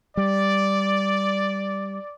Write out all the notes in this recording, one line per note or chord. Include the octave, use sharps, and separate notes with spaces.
G3 D5